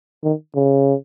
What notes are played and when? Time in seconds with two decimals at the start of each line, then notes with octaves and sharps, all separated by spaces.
0.24 D#3
0.56 C#3